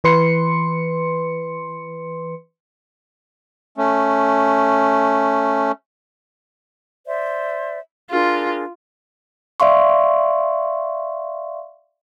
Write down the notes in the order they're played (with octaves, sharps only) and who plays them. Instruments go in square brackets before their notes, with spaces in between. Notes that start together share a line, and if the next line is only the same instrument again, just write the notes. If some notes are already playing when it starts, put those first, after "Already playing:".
[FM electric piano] E3 B4 C6 C#7
[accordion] A3 C#4
[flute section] C5 D5 E5
[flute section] D4 G#4 A#4 [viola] F4
[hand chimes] D5 E5 F5 C6 C#6